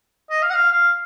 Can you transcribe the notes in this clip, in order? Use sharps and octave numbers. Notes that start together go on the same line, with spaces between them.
D#5
F5
F#5
F5
F5